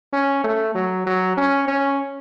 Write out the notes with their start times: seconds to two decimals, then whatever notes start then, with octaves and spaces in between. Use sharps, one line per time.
0.13 C#4
0.44 A3
0.75 F#3
1.06 F#3
1.37 C#4
1.68 C#4